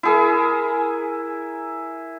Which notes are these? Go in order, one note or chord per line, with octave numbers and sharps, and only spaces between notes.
E4 G#4 A#4